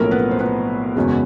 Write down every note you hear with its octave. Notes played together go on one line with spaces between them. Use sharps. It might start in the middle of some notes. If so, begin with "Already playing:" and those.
Already playing: B1 A2 F3 A3 A#3 C#4 A#4
B3 B4
C5
B3 B4
F#1 E2 B2 G#3 C#4